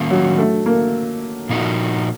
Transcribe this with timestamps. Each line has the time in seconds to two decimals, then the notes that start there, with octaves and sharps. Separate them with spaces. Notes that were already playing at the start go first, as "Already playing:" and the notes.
Already playing: D#3 A#3 C#4
0.11 F#3
0.38 A3
0.66 A#3
1.49 A#2 F3 A#3 D#4 F#4